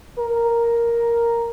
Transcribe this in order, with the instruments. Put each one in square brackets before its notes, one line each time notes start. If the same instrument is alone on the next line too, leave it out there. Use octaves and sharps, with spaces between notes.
[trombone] A#4